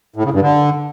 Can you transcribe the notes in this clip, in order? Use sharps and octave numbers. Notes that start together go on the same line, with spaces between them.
A2
C#3
G2
D3